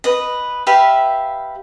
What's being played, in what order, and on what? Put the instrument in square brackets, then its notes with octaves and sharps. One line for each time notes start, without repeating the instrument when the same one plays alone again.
[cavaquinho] B4 D#5
G4 B4 E5 F5